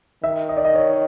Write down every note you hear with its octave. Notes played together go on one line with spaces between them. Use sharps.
D#3 E5
D#5
D5
D#5
C#5